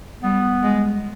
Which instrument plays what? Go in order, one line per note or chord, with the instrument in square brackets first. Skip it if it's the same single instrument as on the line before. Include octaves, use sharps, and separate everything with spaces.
[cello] G3 [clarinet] B3
[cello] G#3